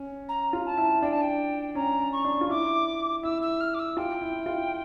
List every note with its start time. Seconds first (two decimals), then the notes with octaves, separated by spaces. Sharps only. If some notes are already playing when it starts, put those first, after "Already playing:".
Already playing: C#4
0.29 A#5
0.53 F4
0.66 A5
0.78 E4
1.02 D4 G5
1.12 A5
1.21 G5
1.75 C#4 A#5
2.12 C#6
2.25 D4
2.41 F4
2.49 E4 D6
3.23 E4 E6
3.42 E6
3.60 F6
3.74 D6
3.79 E6
3.97 F4 G5
4.21 E4
4.46 F4